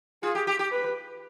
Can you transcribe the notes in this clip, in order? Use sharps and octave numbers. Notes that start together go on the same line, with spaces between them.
F4 G#4
G4
G4
G4
B4